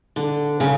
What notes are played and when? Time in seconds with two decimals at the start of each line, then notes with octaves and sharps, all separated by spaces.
0.16 D3
0.60 C#3